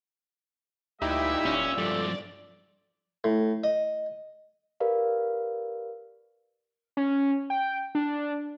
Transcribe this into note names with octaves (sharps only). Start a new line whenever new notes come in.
D2 A#2 G3 D#4 E4 G4 E5
D1 C#4
G2 F3 A4 D5
A2
D#5
G4 A#4 B4 D5 F5
C#4
G5
D4